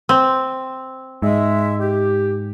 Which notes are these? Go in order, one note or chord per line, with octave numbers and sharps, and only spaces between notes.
C4
G#2 G#3 E5
G4